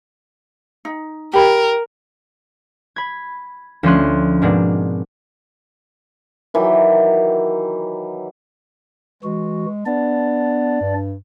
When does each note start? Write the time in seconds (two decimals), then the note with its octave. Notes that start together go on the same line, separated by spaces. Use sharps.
0.85 D#4
1.33 G4 A#4 B5
2.96 B5 G#6
3.83 D2 F3 A3 C#4 C6 F#6
4.42 G#2 B2 G#3 A#3 C4 D4
6.54 D#3 E3 F#3 G4
9.23 E3 G#3 F#4
9.86 B3 D4 D5
10.81 G2